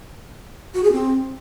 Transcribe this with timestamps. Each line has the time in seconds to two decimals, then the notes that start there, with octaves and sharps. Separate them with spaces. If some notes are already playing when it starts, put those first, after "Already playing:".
0.74 F#4
0.83 G#4
0.92 C4